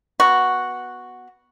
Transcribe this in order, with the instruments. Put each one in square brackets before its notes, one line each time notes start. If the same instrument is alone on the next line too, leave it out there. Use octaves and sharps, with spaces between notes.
[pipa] B3 F#4